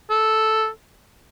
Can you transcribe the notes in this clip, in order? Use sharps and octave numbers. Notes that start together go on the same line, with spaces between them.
A4